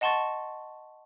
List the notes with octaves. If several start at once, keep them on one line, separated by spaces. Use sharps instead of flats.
D#5 F#5 A5 C6 C#6 A6